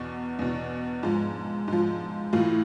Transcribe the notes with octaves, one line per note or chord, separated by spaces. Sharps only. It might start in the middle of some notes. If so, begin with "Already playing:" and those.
Already playing: E2 B2
E2 B2
G#2 F3
G#2 F3
A2 E3 F4